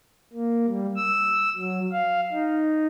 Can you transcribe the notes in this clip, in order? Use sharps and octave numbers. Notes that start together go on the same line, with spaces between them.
A#3
G3
E6
F#3
F5
D#4